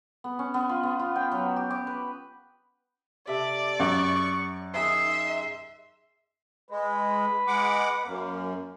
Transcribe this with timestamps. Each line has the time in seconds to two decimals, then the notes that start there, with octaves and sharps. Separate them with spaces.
0.24 B3
0.39 C#4
0.54 B3
0.69 F4
0.83 B3
0.99 F4
1.16 G5
1.31 F#3
1.56 G4
1.70 D6
1.87 B4
3.27 C3 A4 D5 E5
3.80 F#2 C#6
4.74 D#3 D#4 G#4 E5 C6
6.71 G#3 B4
7.47 G#3 F#5 D6
8.06 F#2 A#3